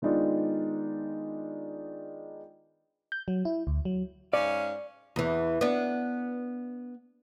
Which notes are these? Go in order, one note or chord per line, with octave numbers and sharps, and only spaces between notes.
D#3 G#3 B3 D4 D#4 F4
G6
F#3
E4
D2
F#3
G#2 C#4 D5 F5
E2 E3
B3 D4